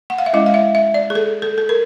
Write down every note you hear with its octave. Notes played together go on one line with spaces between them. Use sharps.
F#5
F5
E5
G#3 C#4 E4 D#5
F5
E5
E5
D5
G#4
A4
A4
A4
A#4